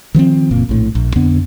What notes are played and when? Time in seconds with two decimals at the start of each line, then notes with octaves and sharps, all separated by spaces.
0.15 D#3 F3 B3 C4
0.51 F#1 A#2 A#3
0.69 A#1 A2
0.95 A#1
1.16 F2 D3 B3